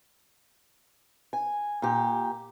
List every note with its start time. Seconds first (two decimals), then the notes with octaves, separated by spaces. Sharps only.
1.33 G#5
1.82 A#2 G4